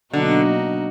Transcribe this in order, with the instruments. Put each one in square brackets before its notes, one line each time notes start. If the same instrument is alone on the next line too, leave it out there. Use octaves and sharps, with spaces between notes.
[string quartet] B2 F#3 A#3 D#4 F#4 [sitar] D3